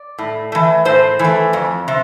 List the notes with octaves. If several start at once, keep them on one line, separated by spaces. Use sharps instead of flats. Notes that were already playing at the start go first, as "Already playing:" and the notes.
Already playing: D5
A2
E3 A3
A2 C5
E3
A3
F2
C3